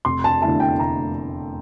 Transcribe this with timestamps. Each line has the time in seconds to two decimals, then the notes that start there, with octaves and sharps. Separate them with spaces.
0.05 F1 C6
0.24 A5
0.42 E2 D3 A3 E4 A5
0.60 G5
0.79 F1 A#5